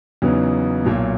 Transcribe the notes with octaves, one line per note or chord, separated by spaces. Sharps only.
E2 C#3 F#3 B3 D#4
B1 A#2 F#3